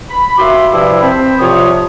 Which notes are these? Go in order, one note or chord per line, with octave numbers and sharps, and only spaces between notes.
B5
D#2 F#4 E5 B5 C6 D6
G2 C3 F3 E4
C4 C5 B5
C2 C3 F3 F4 C#5 D#6